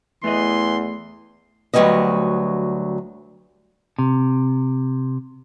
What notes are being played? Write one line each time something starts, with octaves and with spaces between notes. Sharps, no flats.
E2 E3 A3 D#5 C6
D2 G#2 F#3 G3 B3 D#5
C3